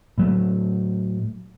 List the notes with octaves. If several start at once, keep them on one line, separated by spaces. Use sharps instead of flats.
A2 F#3 A3